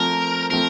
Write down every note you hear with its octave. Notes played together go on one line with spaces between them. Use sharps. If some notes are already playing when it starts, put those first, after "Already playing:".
Already playing: F3 A3 C4 A#4
F3 A3 C4 A#4